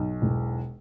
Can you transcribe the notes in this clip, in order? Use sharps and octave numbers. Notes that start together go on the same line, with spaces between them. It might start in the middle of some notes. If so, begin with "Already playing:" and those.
Already playing: B1
E1